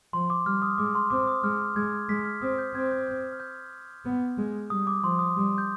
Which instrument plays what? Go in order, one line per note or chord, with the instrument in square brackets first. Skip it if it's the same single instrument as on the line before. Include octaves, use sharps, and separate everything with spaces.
[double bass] F3 [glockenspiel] C6
[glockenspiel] D6
[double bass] G3 [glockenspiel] F6
[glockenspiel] D#6
[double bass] G#3 [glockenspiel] D6
[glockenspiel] C6
[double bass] C4 [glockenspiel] D6
[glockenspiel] D#6
[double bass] G#3 [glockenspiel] F6
[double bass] G#3 [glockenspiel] G#6
[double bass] G#3 [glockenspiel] B6
[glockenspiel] F6
[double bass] C4 [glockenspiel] D#6
[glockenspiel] G6
[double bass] C4 [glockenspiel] G#6
[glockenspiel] G6
G6
F6
G6
[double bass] B3
G#3
[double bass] G3 [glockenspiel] D#6
[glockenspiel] D6
[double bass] F3 [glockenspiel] C6
[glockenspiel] D#6
[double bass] G3
[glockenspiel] G6